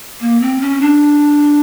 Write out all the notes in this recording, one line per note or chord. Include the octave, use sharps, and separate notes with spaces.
A#3
C4
C#4
D4